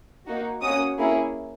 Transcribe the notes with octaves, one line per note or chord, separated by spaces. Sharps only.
A#3 D#4 F#4
A#3 C#4 F#4 D#6
A#3 C#4 E4 G#4